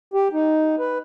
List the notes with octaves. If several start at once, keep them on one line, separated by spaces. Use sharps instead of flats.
G4
D#4
B4